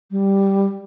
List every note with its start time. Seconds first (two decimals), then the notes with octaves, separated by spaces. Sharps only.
0.11 G3